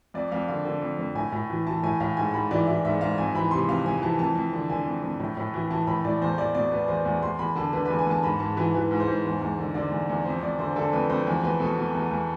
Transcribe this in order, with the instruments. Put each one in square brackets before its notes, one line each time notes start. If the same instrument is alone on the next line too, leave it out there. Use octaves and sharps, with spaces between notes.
[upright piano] F2 D5
F2 F5
D3 F5
D3
F2
F2
A2 G#5
A2
E3
E3 A5
A2 G#5
A2 F5
G#2 G#5
G#2 B5
E3 D5
E3 E5
G#2 E5
G#2 F5
F2 G#5
E3 B5
C3 C6
F2 F5
F2 G#5
E3 A5
F2 A5
F2
D3
D3 G#5
F2
F2
A2
A2
E3
E3 A5
A2 B5
A2 D5
E2 C5
E2 D5
B2 D5
B2 B4
E2 C5
E2
E2 C6
E2 B5
D3 A5
D3 B4
E2 B4
G#5
E2 A5
G#2 B5
G#2 A5
E3 B4
E3 B4
G#2
C5
G#2
E2
E2
D3
D3 D5
E2
E2
F2 C5
F2 D5
D3 C5
D3 A4
F2 B4
F2 C5
E2 C5
E2 B4
B2 A4
B2
E2
E2